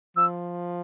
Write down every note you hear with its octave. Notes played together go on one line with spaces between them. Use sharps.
F3 E6